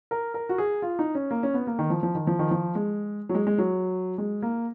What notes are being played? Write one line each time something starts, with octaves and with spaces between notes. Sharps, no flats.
A#4
A#4
F#4
G#4
F4
D#4
C#4
A#3
C#4
B3
A#3
D#3
F3
F3
D#3
F3
D#3
F3
G#3
F#3
G#3
G#3
F#3
G#3
A#3